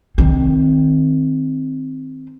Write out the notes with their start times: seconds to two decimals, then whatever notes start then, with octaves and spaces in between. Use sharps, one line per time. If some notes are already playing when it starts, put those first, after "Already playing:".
0.18 D#3 C4